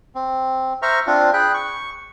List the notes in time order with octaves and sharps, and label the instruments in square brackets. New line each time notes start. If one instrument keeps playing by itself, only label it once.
[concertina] C4
C5 E5 A#5 C#6 F6
C4 D4 F4
G#4 G5 B5 F#6
C#6